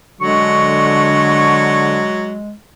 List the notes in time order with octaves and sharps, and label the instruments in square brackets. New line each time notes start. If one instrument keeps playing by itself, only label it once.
[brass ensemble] D3 [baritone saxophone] F#3 [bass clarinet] G#3 [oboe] C#6